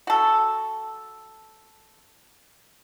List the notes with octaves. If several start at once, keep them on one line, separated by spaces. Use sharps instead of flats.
F#4 A4